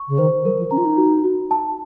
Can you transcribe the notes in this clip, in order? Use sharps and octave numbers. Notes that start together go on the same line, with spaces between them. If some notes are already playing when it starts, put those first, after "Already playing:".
Already playing: C#6
C#3
D#3 C5
F#3 A#4
F3
C#4 A#5
F4
D#4
F#4
F#4
A5